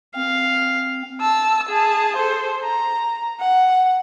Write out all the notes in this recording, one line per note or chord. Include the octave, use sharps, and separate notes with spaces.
C4 F5
A5 E6
G#4 A5
A4 C5
A#5
F#5